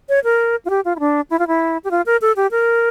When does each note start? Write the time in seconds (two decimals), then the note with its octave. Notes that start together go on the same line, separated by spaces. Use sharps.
0.09 C#5
0.24 A#4
0.65 F4
0.70 G4
0.85 F4
0.96 E4
1.00 D4
1.30 E4
1.39 F4
1.48 E4
1.84 G4
1.91 F4
2.06 A#4
2.22 A4
2.36 G4
2.51 A#4